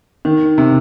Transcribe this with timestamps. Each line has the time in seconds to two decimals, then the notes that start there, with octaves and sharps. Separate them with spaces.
0.25 D#3
0.58 C3